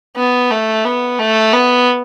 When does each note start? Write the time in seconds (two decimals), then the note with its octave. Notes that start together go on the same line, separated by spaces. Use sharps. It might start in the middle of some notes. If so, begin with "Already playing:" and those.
0.16 B3
0.50 A3
0.84 B3
1.19 A3
1.53 B3